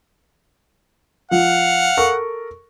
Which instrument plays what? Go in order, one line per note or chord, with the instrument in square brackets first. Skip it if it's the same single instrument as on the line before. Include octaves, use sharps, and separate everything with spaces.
[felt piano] F3 [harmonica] F5 F#5
[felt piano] A4 A#4 C#6